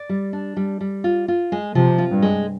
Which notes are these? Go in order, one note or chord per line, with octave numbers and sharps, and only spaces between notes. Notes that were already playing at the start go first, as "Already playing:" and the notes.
Already playing: D5
G3
D4
G3
G3
F4
F4
G#3
C3 F3
F4
G2
G#3